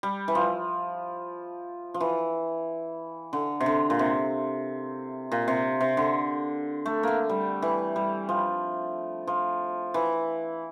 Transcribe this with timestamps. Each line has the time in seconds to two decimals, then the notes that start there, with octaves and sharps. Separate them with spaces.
0.03 G3
0.28 E3
0.35 F3
1.94 F3
2.00 E3
3.33 D3
3.60 C3
3.66 D3
3.90 A#2
3.99 C3
5.32 A#2
5.48 C3
5.81 C3
5.97 D3
6.86 A3
7.03 A3 A#3
7.29 G3
7.62 E3
7.96 G3
8.29 F3
9.27 F3
9.94 E3